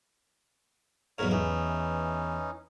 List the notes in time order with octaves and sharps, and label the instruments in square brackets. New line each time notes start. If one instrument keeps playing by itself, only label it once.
[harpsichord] B1 E2 G#2 [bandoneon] A#4 C#5
[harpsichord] E2 [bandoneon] E3 C#4 D#4